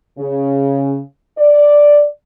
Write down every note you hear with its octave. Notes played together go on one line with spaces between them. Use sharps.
C#3
D5